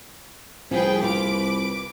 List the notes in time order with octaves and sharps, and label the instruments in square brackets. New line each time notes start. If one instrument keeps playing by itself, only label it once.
[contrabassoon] C2 [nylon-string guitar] F3 [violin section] G#4 B4 G5
[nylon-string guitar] F4 [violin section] B4 D6 D7